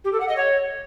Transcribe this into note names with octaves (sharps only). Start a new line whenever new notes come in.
G4
A4
F#5
D#5
C#5